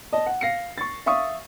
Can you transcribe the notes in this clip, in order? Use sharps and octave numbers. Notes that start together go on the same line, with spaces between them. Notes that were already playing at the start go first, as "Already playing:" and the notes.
D#5 A5
F#5
F5 A#6 C7 C#7
C#6 A6
E5 F5 C#6 D#6